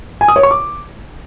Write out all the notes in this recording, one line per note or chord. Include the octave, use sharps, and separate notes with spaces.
G#5
D#6
C#5
C#6
D6